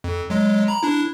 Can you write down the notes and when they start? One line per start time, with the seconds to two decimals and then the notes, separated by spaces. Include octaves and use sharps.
0.04 F2
0.30 F#3 G#3
0.68 A#5 B5
0.83 D4 E4